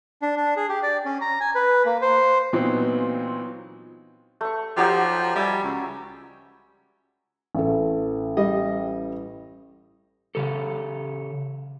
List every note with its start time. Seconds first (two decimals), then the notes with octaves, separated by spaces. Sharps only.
0.22 D4
0.36 D4
0.56 G#4
0.69 G4
0.83 D5
1.05 C#4
1.21 A#5
1.40 G#5
1.55 B4
1.86 A#3
2.01 C5
2.53 A#2 E3 F#3 B3 C4 D#4
4.41 A3 C#6
4.77 F3 F#3 D#4 G4
5.36 G3 E5 G#5
5.64 C#2
7.55 A1 A4
8.37 G3 D#5
10.35 C#3 G4 A4